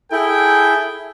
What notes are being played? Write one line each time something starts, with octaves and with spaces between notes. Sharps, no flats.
E4 G#4 A4 G5